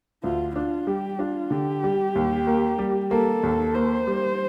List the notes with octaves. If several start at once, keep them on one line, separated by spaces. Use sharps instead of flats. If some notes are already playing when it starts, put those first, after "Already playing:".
D2 F4
D4 F4
G3 G4
D4 F4
D3 G4
G3
D#2
A#3
G3
A#3 A4
D#2
A#3 C5
G3